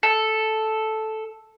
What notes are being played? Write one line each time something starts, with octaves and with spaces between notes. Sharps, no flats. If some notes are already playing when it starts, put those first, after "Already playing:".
A4